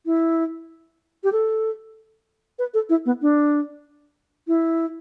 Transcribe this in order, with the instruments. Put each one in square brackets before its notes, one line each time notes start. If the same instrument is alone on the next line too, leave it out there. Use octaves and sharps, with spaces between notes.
[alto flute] E4
G4
A4
B4
A4
E4
B3
D4
E4